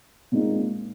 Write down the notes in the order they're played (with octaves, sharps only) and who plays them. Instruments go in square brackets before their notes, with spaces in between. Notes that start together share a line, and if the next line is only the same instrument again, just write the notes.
[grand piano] A#2 G#3 C4 D#4